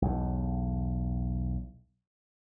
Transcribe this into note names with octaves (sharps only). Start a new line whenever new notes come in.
B1 E2